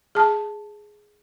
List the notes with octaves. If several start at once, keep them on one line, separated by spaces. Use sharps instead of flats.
G#4 A5